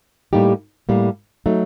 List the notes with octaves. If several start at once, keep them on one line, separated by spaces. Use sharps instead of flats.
A2 G3 A#3 D#4 G4
A2 G3 A#3
F#3 A3 D#4